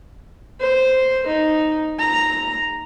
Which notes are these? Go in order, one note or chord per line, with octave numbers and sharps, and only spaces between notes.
C5
D#4
A#5